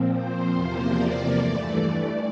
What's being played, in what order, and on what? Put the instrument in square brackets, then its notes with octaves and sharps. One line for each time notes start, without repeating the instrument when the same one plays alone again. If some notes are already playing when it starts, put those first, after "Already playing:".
Already playing: [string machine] A#2 F3 C4
C5
E2 C3 F3 A#3
D5
G2 E3 A3